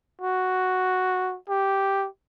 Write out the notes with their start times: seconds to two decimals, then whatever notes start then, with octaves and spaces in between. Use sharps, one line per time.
0.22 F#4
1.49 G4